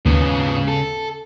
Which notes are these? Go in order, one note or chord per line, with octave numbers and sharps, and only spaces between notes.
D#2 G#2 C#3 B3
A4